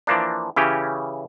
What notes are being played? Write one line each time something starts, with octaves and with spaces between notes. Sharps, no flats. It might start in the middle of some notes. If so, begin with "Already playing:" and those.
E3 F3 A#3 D4
C#3 E3 C#4 G4